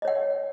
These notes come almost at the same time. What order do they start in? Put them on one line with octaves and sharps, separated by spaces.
D#5 C#5 F#5